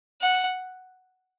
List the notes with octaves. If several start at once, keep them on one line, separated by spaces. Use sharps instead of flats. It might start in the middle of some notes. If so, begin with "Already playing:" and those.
F#5